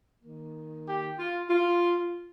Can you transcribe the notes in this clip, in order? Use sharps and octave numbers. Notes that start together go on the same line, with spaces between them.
D#3 A#3
G4
F4
F4